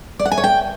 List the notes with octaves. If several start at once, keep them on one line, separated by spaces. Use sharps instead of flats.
D5
F#5
G#5
C#5
G5